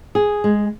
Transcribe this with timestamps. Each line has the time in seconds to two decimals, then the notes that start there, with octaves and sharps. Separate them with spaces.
0.15 G#4
0.44 G#3